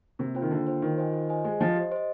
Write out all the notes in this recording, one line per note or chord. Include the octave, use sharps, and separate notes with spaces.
C3 A#3
F4 C5 G5
D#3
D3 A#3
F4 C5 G5
D#3 F4
C5 D#5 G#5
F4
C5 D#5 G#5
G#3 G4
F3 C5 D#5
G4
C5 D#5